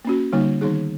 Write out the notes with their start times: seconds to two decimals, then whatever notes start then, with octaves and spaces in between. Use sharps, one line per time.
0.05 A#3 C#4 F#4
0.33 D3 G3 A#3 D#4
0.61 D#3 G3 B3 D#4 G#4